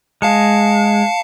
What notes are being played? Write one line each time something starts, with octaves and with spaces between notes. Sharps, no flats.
G#3 F5 A5 C#7